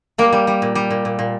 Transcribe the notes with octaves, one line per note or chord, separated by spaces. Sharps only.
G3 A#3
G3
G3
A#2
G3
A#2
A#2
A#2